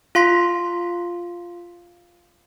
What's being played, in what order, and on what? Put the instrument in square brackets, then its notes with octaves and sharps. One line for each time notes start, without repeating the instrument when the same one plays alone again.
[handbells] F4 F5 C6 B6